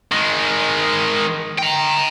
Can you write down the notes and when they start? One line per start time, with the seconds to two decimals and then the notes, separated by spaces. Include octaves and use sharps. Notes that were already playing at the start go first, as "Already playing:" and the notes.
0.12 D#3 G#3
1.59 G5 A#5